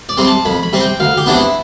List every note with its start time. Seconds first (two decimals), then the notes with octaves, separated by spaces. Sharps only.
0.09 D5
0.17 C3 G3 C4
0.27 A5
0.45 F2 B5
0.63 B5
0.73 C3 G3 C4
0.81 G5
1.00 D2 F5
1.17 G4
1.26 C3 E3 B3 D4
1.36 E4